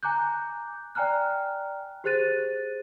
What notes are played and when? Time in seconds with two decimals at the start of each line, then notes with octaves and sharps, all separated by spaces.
0.03 G#5 A#5 D6 F#6 G6
0.95 D5 G5 G#5 A#5 F6 F#6
2.04 G4 G#4 C5 F#6 A6 D#7